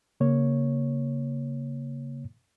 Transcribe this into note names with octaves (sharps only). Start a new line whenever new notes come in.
C#3 A#3 C#5